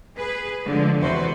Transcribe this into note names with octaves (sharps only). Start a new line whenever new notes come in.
G#4 B4
D3 F3 G#3
E2 C3 F#4 B4 C5